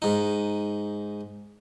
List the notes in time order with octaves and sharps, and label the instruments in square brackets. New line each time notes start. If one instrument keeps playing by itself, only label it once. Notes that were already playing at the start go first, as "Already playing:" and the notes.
[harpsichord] G#2 D#4